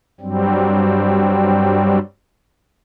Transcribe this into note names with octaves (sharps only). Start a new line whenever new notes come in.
G2 F#3 G3 C4